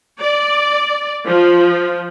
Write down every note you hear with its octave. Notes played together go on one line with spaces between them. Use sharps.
D5
F3